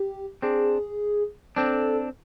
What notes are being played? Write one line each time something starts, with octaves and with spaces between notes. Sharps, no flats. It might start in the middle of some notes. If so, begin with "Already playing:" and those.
Already playing: G4
C4 D4 G#4
C4 D4 A4